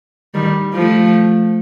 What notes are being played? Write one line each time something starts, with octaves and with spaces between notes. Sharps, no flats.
D#3 G3
F3 A3